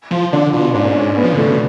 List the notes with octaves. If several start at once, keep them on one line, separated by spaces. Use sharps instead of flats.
F3 F4
D3 D4
B2 F4
G#2 D4
D4
C#4
B3
F3
D3
C#3 A3
B2